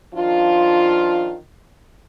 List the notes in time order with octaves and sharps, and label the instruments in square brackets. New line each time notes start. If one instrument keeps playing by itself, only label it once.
[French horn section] D#3 F3 D4 F4